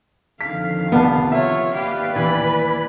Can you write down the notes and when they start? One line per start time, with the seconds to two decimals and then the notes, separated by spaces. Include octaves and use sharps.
0.41 F2 D3 D#3 F5 B6
0.92 C2 B3 A5
1.32 F4 C#5 E5
1.72 D#2 G4 B4 D5 F5
2.16 E3 B5